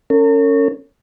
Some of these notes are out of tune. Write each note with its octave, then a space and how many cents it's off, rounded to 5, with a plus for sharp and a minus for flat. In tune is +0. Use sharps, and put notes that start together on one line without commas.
C#4 +0 A#4 -45